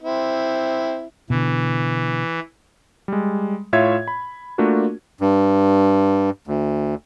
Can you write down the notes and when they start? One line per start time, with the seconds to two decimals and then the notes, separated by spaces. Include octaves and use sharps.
0.02 C4 E4
1.30 B2 D3 E3
3.08 G3 G#3
3.73 A2 F4 C#5 E5 F5 G#6
4.08 B5
4.58 A3 A#3 D4 F4 F#4 A#4
5.21 G2
6.47 D2